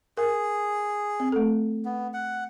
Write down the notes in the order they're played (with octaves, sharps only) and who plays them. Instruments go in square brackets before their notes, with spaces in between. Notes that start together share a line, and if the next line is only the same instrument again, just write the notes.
[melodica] G#4 [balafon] A#4
[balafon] C4
A3 A4
[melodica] B3
F#5